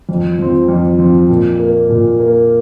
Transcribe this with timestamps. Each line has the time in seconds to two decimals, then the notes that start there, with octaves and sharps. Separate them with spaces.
0.09 F2
0.39 F3 C4
0.68 F2
0.99 F3 C4
1.29 A#2
1.59 A#3
1.89 A#2
2.20 A#3